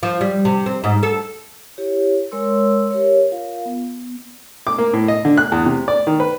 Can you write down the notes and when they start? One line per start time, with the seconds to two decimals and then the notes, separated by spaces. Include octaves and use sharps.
0.03 F3
0.21 G3
0.45 C3
0.66 C4
0.84 G#2
1.03 A4
1.78 E4 G4 C#5
2.31 G#3 A#4 C#5 C6 E6
2.91 G4 A#4 C#5
3.32 F4 A#4 F5
3.65 B3
4.67 D6
4.78 A#3
4.93 A2
5.08 D#5
5.25 D3
5.37 F#6
5.52 E2
5.66 C3
5.88 D5
6.07 D#3
6.20 B4